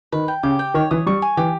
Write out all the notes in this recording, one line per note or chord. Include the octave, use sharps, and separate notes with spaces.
D#3 B4
G5
C#3 G4
G5
D#3 C#5
E3 D#6
G3 C#6
G#5
E3 G4